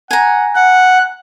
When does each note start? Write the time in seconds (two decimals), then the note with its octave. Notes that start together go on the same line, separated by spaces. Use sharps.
0.11 F#5 G#5 A#5
0.56 F#5 F#6